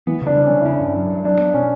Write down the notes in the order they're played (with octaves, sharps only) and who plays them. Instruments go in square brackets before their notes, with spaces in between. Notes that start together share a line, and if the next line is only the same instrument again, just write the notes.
[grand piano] E3 [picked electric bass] B3
[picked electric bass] C#3 [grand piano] D4
[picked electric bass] G3
[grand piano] C#4
[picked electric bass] C#3
[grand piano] E4
[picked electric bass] C#4 [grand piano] D4
[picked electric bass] G2
F#3
G2
[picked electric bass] F#3 [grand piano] D4
[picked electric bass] B3
[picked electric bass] B2 [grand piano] C#4